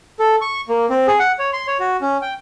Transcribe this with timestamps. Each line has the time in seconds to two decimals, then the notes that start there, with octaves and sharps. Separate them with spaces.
0.19 A4
0.41 C#6
0.69 A#3
0.90 C4
1.07 G#4
1.19 F#5
1.39 C#5
1.53 C6
1.67 C#5
1.80 F#4
2.01 C#4
2.22 G5